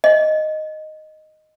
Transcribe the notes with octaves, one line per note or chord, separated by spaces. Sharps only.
D#5